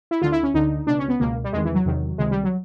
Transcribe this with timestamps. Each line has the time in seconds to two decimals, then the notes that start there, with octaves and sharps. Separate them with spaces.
0.11 E4
0.22 D2 D3 F4
0.32 E4
0.43 C#4
0.54 D2 D3 D#4
0.87 C#2 B2 D4
0.99 C#4
1.09 B3
1.20 C#2 B2 A#3
1.44 G3
1.53 E2 C3 D#3 G#3
1.65 E3
1.75 F#3
1.86 E2 C3 D#3
2.18 C#2 C3 D#3 G#3
2.31 G3
2.44 F#3